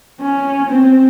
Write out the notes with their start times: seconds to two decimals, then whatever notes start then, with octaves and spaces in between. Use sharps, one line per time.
0.21 C#4
0.70 C4